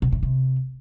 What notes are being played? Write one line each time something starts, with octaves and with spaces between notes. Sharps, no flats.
B2
A2
C3